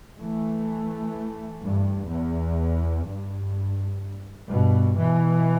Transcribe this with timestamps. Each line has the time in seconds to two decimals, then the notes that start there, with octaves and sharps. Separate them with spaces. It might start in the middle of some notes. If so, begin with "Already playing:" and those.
0.19 E3 A3
1.63 G2
2.11 E2
3.07 G2
4.50 G2 B2
4.98 B2 E3